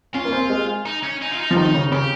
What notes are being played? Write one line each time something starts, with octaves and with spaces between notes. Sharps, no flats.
C#4 F4
A#3
C4
G#3
D#4
C#4
D#4
F4
D#4
F3
D#3 D#4
C#3
C#3 G4